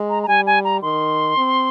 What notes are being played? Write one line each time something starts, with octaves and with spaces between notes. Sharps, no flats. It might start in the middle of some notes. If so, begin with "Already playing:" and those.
Already playing: G#3
A#5
A#5
G3 G#5
G#5
A#5
D#3 C6
C4